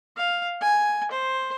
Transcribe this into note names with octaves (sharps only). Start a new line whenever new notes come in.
F5
G#5
C5